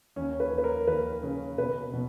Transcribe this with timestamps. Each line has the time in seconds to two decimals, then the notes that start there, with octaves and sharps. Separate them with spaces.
0.16 D#2 C#4
0.40 B4
0.52 D#2
0.58 B4
0.64 A#4
0.87 D#2 B4
1.23 C#3
1.58 B2 B4
1.93 B2